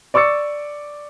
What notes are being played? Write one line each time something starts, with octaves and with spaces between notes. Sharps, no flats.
D5 C#6 D6 E6 A6 C#7